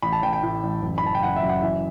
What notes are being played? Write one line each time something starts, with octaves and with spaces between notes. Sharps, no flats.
A1 B5
A5
A1 G5
G5
A2
A1
F#1
B5
E3 A5
G5
F#1 F#5
E5
F#2
F#5
E3 E5